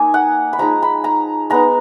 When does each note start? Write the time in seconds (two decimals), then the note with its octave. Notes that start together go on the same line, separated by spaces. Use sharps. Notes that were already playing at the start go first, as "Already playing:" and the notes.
Already playing: A#3 D#4 G#5
0.14 F#5
0.53 B5
0.58 F3 G#3 D#4 A#5
0.83 B5
1.04 A#5
1.50 G#3 B3 D#4 A#5